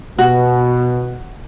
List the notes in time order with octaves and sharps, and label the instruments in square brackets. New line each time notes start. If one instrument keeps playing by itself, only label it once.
[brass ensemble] B2 [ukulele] F#4